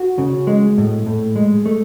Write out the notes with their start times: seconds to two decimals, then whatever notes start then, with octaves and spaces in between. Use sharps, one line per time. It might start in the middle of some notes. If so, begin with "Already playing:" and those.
Already playing: F#4
0.18 C#3
0.47 G#3
0.78 A2
1.06 A2
1.36 G#3
1.66 A3